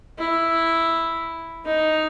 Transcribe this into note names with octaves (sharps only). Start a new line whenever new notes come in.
E4
D#4